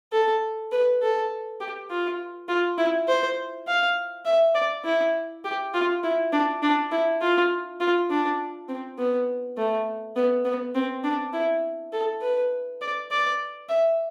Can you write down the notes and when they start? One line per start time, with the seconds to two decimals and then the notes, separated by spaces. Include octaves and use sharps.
0.13 A4
0.72 B4
1.02 A4
1.60 G4
1.90 F4
2.48 F4
2.78 E4
3.08 C5
3.67 F5
4.26 E5
4.55 D5
4.85 E4
5.44 G4
5.74 F4
6.04 E4
6.32 D4
6.62 D4
6.92 E4
7.21 F4
7.80 F4
8.10 D4
8.68 C4
8.98 B3
9.57 A3
10.16 B3
10.45 B3
10.75 C4
11.04 D4
11.33 E4
11.93 A4
12.22 B4
12.81 D5
13.11 D5
13.69 E5